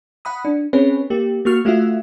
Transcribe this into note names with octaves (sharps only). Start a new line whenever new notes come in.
F#5 B5 D#6
D4
C4 C#4 G#4 B4 C#5
A#3 G4
A#3 F#4 C#6 F6
A3 F4 F#4 E5 F#5